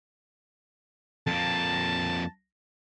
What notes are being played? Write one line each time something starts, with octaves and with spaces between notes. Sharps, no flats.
F2 A#3 A5